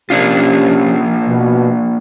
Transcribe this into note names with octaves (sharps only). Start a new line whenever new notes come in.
C3 A#3 C#4 D4 F4 G4
B2